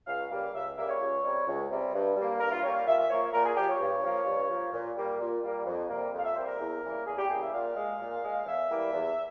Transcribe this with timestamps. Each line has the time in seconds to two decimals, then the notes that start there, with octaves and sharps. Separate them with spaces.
0.07 C#2 F5
0.30 C#3 G3 A#3 F5
0.54 C#2 E5
0.77 C#3 G3 A#3 E5
0.89 C#5
1.00 C#2
1.24 C3 G3
1.47 C#2
1.71 C3 G3
1.94 G2
2.16 G3 A#3
2.40 G2 A#4
2.52 F4
2.63 G3 A#3 C#5
2.75 F5
2.87 A#2 E5
2.98 E5
3.10 F3 A#3 C#5
3.33 A#2 A#4
3.45 G#4
3.56 F3 A#3 G4
3.69 C#5
3.80 G2
4.04 F3 A#3
4.26 G2
4.49 F3 A#3
4.73 A#2
4.96 G3 A#3
5.20 A#2
5.43 G3 A#3
5.66 F2
5.89 C3 G3 A#3
6.13 F2 F5
6.24 E5
6.36 C3 G3 A#3 C5
6.48 A#4
6.60 E2
6.83 C#3 E3 G3 A#3
7.06 E2 G#4
7.18 G4
7.29 C#3 E3 G3 A#3 G#4
7.41 E5
7.53 A#2 F5
7.76 G#3
7.99 A#2
8.23 G#3
8.46 E2 E5
8.70 E3 G3 A#3
8.93 E2